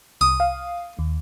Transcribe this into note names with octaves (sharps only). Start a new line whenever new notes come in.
C2 D#6
F5
D#2